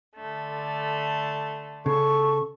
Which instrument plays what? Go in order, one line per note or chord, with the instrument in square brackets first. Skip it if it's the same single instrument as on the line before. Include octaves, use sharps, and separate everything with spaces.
[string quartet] D3 A3
[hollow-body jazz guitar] C#3 [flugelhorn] A4 [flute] C#6